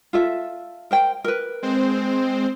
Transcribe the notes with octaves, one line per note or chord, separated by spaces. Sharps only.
F4 A4 E5
A#4 C5 G5
A#4 B4
G#3 C4 C5